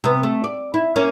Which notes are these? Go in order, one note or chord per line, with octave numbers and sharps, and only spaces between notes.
C3 B3
A3
D5
E4
A#3 C#4